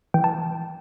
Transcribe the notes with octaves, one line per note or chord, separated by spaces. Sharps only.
E3 G5
A5